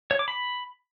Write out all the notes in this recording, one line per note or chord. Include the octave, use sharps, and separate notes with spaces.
C#5
D6
B5